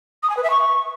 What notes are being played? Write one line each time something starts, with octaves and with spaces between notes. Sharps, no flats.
D#6
G#5
B4
E5
C#6